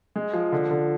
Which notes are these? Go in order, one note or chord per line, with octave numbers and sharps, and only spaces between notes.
G#3
F3
D3
D3